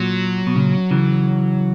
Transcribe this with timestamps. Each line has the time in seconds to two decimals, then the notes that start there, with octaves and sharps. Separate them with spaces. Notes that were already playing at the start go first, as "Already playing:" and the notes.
Already playing: A#2 F#3
0.47 B2
0.56 A#2 C#3
0.91 C#3 E3